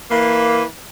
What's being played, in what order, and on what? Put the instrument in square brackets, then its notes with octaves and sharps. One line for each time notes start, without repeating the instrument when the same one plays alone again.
[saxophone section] E3 A#3